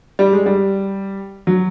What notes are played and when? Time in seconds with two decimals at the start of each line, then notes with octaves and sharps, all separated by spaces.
0.19 G3
0.33 G#3
0.46 G3
1.47 F#3